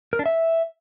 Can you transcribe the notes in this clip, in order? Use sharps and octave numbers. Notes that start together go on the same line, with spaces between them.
A#4
D4
E5